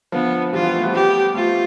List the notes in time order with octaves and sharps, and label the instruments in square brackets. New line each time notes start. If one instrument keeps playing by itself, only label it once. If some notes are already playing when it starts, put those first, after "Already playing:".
[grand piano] D3 F3 [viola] B3
[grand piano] E3 G3 [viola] F4
[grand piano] G3 B3
A3 C4
G3 B3
[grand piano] G3 B3 [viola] G4
[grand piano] A3 C4 [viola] F4